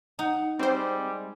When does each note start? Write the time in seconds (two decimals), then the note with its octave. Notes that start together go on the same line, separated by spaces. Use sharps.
0.19 D#4 F#5
0.59 G3 G#3 C4 C5